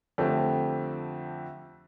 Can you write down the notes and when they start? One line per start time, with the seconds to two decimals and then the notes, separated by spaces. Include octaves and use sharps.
0.18 F2 D3 A3 C4 G4